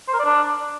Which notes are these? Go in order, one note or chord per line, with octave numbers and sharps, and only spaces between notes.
C5
A#4
D5
D4